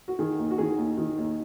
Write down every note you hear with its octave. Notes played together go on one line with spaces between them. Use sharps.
F#4
D#3 G#4
D#2
F#4
D#3 G#4
D#2
D#3
D#2